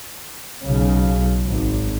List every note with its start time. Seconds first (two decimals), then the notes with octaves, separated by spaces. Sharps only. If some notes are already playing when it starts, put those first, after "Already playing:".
0.63 B1 C#3
1.46 G#1